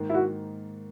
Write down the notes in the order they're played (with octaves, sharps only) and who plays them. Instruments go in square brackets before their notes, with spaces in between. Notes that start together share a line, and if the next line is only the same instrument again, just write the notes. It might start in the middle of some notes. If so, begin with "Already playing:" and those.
Already playing: [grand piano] G#2 D#3 A#3
[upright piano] E4
F#4